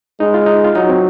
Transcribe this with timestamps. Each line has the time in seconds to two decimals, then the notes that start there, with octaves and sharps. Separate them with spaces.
0.20 G#3 D#4
0.34 F4
0.46 D#4
0.64 F4
0.75 F#3 D#4
0.89 C4